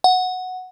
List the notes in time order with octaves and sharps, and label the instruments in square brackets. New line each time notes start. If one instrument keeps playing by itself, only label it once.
[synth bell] F#5